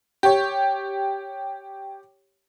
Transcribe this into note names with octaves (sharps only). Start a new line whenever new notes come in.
G4 C#5